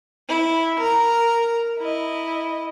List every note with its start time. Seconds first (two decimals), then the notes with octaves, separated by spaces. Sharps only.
0.29 E4
0.79 A#4 A#5
1.79 E4 D#5